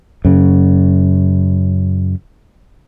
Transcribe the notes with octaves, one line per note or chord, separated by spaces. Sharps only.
F#2 C#3